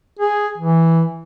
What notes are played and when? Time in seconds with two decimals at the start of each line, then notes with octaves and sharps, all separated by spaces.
0.19 G#4
0.58 E3